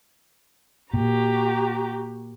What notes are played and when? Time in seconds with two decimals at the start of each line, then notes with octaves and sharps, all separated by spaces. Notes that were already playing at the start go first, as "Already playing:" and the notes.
0.94 A#2 F#4 G4 A#5